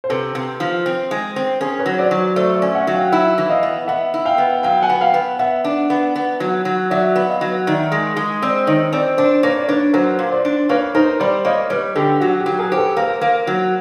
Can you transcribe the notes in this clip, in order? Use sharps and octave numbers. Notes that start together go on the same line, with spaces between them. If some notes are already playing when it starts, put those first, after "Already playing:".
C5
C3 A4 B4
C3
F3
C4
G#3
C4
C#4 G#4 A#4
B4 C#5
F#3
C5 D5
F#3
A3 C5 D5
D5 E5
C#4
E5 F#5
F#3
F5 G5
E4 E5 F#5
E3
D#5 F5
B3
B3 E5 F#5
E4
F5 G5
B3
F#3 F5 G5
F#5 G#5
B3
F5 G5
B3
B3 E5 F#5
D4
B3
B3
F#3
F#3
F#3 D5 E5
B3
D#5 F5
F#3
D#3 D5 E5
G#3
G#3
C4 C5 D5
D#3 C#5 D#5
C4 C5 D5
D4 C5 D5
A#3 B4 C#5
D5
D4 B4 C#5
F#3 A#4 C5
A#2
C5 D5
D4
A#3 B4 C#5
D#4 A#4 C5
G3 C5 D5
A#3 C#5 D#5
G3 B4 C#5
D3 G4 A4
F#3 F#4
G4
F#3
G#4 A#4
G4 C5
A4 B4
A#3 A#4 C5
A#3
F#3